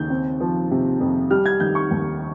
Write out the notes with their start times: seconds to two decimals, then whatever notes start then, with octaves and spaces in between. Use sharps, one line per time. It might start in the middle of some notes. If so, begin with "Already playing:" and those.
Already playing: D#2 C#3 G6
0.10 C4
0.40 F3
0.71 C3
1.00 F2
1.30 G3 F6
1.46 G#6
1.60 D#3 G6
1.75 C#6
1.91 D#2